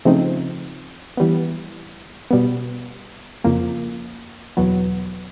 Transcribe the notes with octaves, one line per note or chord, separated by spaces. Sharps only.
C#3 F3 A3 C4 D#4
E3 G3 B3
B2 G3 B3
F2 C#3 F3 A#3
E2 B2 F#3 B3